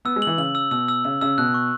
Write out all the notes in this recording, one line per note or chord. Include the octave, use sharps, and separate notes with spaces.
B3 E6
G#3
E3 F#7
C#3 F#7
E6
B2 E6
E6
C#3 E6
C#3 E6
B2 F#6
C#6